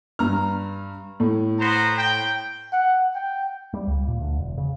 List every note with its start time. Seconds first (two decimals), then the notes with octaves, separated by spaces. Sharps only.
0.19 G2 A#5 F6
1.20 A2
1.60 B3 C5 A#5
1.98 G5
2.73 F#5
3.15 G5
3.74 G3
3.87 C#2
4.08 A#2
4.21 D2
4.38 E1
4.58 C#3